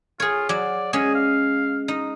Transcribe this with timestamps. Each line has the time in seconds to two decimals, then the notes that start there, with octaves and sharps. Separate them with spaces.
0.20 F4 G#4 C#5
0.49 F#3 D5
0.93 G#3 C#4 G#4
1.15 F5
1.88 D#4